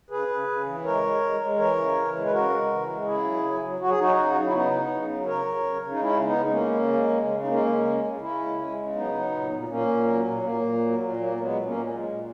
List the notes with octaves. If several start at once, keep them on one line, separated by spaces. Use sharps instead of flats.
C#3 G#4 B4
C#3
C#3
E3
G#3 A#4 C#5
G#3
G#3
G#3
E3 A#4 C#5
C#3
E3
G#3
B4
C#3 F#4 A#4
G#3
E3
G#3
C#3 E4 G#4
F#3
F#3
F#3
F#3 F#4
G#4
F#3 D#4 F#4
C#3
F#3
E4
C#3 B3 D#4
C#3
C#3
F#3
C#3 A#4 C#5
C#3
C#3
C#3
D#4
G#3 C#4 E4
G#3
B3 D#4
G#3
A#3 C#4
C#3
C#3
G#3
C#3
C#3
D#4
G#3 A#3 C#4
G#3
C#3
C#3
C#3 C#4 E4
G#3
G#3
C#3
F#3 B3 D#4
F#3
A#2
A#2
A#2 A#3 C#4
A#2
F#3
A#2
A#2 A#3
A#2
F#3
A#2
F#3 A#3
F#3
G#3 B3
A#2
A#3 C#4
A#2
G#3
A#2